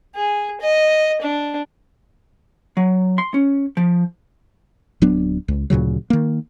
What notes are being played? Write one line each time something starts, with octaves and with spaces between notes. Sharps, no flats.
G#4
D#5
D4
F#3
C6
C#4
F3
D1 F#3 B3 D4
C#2
D2 A#2 C#3 F#3
D#3 A#3